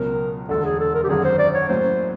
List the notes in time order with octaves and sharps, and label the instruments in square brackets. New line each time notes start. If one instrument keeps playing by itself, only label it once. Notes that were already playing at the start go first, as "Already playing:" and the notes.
Already playing: [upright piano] C#2 B2 F#3 [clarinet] A#4
[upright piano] E1 D2 D3 [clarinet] A4
[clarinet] G#4
A4
A#4
G4
[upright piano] G#1 F#2 D3 [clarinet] G#4
[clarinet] C5
D5
C#5
[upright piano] A2 F#3 A#3 C#4 [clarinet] C5